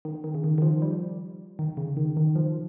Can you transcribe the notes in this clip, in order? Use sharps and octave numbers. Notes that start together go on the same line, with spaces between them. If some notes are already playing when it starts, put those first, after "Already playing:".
D#3
D#3
C#3
D#3
D#3
F3
G3
D#3
C#3
D#3
D#3
F3